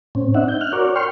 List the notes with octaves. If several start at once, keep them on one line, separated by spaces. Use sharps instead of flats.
A2 C4 C#4
C4 D4 D#4 E5 F#5
G6
F6 F#6
F#4 A#4 C#5 D5
G5 C6 C#6 F6